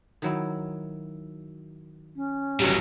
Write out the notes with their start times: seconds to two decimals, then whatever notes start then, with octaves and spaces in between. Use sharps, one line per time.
0.22 D#3 F#3 E4
2.16 C#4
2.60 G1 C#2 A2 F#3 G3